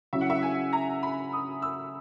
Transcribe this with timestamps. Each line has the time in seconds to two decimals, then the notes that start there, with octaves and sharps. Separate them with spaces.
0.13 C#3 F#3 C#4 E4 E5
0.21 F#5
0.30 E5
0.43 G#5
0.73 A#5
1.03 B5
1.33 D#6
1.62 E6